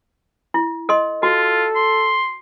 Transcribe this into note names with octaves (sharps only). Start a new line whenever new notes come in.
E4
A4 D#5 C6
F4 F#4 A4
C6